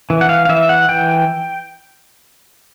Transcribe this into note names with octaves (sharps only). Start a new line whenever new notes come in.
E3
F#5
F5
F5
E3 E5
F#5
E3 G5